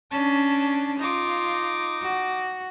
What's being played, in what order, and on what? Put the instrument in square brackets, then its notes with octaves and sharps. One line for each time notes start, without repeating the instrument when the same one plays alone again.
[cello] C#4 D4 [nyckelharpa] A5
[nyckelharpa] D#4 D6 [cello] F4
[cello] F#4